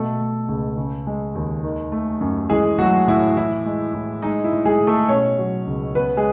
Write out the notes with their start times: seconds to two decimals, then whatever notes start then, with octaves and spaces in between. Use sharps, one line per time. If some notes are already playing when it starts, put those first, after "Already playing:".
Already playing: B2 A3 A4
0.19 A3
0.48 C#2
0.77 C#3
1.07 G#3
1.35 D#2
1.63 D#3
1.92 A3
2.21 F#2
2.50 E3 G#3 G#4
2.78 F#3 A3 F#4
3.07 A2 E4
3.36 E3 E4
3.66 G#3
3.94 A2
4.22 G#3 D#4
4.44 E4
4.52 A2
4.65 G#3 G#4
4.80 A2
4.87 A3 A4
5.09 B2 C#4 C#5
5.38 F#3
5.67 C#2
5.95 C#3 B3 B4
6.17 G#3 G#4